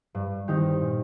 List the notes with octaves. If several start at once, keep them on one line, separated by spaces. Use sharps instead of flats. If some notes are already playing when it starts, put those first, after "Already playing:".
G2
D#3 C4 D#4 G4
A#2